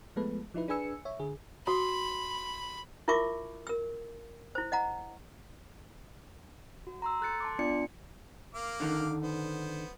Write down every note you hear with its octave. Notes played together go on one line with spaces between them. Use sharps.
F3 G#3 A3 B3 A4 B4
F3 D#4 E4 B4
D4 G#4 B4 G#5 E6 C#7
C#5 E5
D3 G#4
F#4 B5 C6
E4 F4 A#4 E5 C#6 D6
A#4 E6
E4 C5
D#5 F#5 A#5
F#4
A#5 C6 E6
A4 F#6 G6 A6 C#7
A5 C6 D6
B3 D4 F4 D5 C#7
A#3 F5 D6
D3 D#3
B3 C5